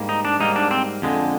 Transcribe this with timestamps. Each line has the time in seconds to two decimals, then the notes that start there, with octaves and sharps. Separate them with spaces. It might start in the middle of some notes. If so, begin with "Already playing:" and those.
Already playing: G#2 G3 A#3
0.09 D#4
0.25 D4
0.40 G#2 G3 A#3 D#4
0.56 D4
0.71 C4
1.02 F2 D3 G#3